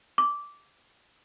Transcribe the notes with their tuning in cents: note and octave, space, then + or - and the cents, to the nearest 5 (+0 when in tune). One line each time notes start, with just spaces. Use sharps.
D6 -15